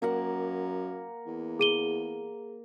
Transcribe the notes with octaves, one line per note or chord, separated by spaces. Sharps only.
F#2 A#3 A#4 F#5
E2
G#4 D#7 G7